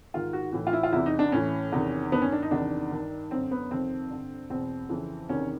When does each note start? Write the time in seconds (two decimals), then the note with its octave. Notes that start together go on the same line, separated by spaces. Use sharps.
0.14 G#2 D#3 F4
0.33 F#4
0.53 A2 E3
0.67 F4
0.73 E4
0.83 F4
0.92 E2 C3 E3 E4
1.06 D#4
1.19 D4
1.32 A2 E3 C#4
1.72 E2 C3 D#3
2.12 G2 D#3 B3
2.22 C#4
2.32 D4
2.42 D#4
2.51 E2 C3 D#3 D4
2.91 G2 D#3
3.31 F#2 D3 C4
3.51 B3
3.71 F2 C3 D#3 C4
4.10 G2 D3
4.50 E2 B2 C4
4.89 F2 C#3 E3
5.29 E2 C3 D#3 C#4